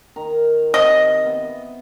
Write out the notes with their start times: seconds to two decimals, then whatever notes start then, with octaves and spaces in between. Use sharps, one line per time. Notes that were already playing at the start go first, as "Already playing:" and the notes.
0.16 D#3 A#5
0.74 C3 D#5
1.26 B3 E5